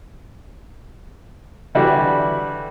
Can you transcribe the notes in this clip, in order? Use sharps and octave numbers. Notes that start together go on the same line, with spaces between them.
D3 E3 G3 E4 F#4